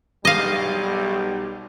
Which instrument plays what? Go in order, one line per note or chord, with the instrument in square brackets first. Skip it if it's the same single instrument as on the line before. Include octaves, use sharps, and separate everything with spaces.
[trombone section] B1 G3 [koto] D#5 F5